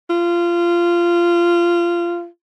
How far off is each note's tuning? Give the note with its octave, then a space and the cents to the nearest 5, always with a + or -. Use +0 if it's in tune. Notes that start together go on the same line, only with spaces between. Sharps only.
F4 -20